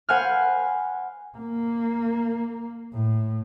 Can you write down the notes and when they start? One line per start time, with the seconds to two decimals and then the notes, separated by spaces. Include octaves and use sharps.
0.09 C5 F#5 G#5 B5 F6
1.38 A#3
2.93 A2